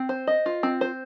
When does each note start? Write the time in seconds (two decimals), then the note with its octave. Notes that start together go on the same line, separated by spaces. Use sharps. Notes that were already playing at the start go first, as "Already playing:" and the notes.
Already playing: C4
0.09 C5
0.27 D#5
0.46 F4
0.63 C4
0.81 C5